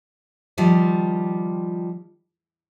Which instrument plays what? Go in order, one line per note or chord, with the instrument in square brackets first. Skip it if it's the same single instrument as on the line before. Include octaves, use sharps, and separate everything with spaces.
[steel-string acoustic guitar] D#3 F3 G3 F4